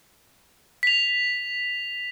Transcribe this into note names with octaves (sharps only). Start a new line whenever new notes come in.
B6 F7